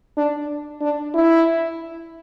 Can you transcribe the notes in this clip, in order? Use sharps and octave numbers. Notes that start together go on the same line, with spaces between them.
D4
D4
E4